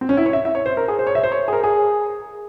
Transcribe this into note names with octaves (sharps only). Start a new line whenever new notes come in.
C4
C#4
E4
C#5
E5
E5
C#5
C5
A#4
G#4
C5
C#5
E5
C5
C#5
G#4
A#4
G#4